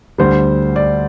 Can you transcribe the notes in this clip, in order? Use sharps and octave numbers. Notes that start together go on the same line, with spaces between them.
D2 D3 G3 C5
D5